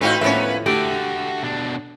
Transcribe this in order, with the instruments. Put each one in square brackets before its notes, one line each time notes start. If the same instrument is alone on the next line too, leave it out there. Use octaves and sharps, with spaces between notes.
[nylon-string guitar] A2 E3 F5 [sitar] C4 D#4 F#4 [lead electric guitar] B4
[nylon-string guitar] D#2 A2 F3 [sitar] A#3 C#4 [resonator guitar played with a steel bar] B3 E5
[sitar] D3 [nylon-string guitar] A3 [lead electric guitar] F#4 E5 [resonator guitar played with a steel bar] G4
[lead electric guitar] B2 D4